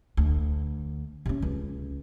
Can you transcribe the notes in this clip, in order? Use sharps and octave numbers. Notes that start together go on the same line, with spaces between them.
D2
C3 C#4
C#2